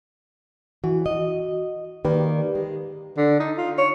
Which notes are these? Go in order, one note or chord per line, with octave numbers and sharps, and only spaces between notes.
E3 F#4
D#5
D#3 A#3 G4 B4 D5
G#3
D3
D#4
F4
C#5